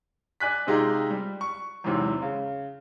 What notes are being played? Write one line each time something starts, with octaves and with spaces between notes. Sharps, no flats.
D5 G#5 F#6 B6
C3 G#3 D#4 F4 G4 G#4
G3
C#6
E2 G#2 C3 F#3
C#3